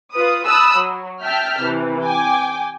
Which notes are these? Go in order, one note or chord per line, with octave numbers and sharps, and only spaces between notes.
F4 B4 D#6
A5 B5 D#6 E6 F#6
F#3
E5 G5 A5 F6 G6 B6
C3 E3
G5 G#5 D6